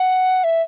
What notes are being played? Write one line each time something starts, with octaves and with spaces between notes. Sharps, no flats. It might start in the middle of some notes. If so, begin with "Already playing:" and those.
Already playing: F#5
E5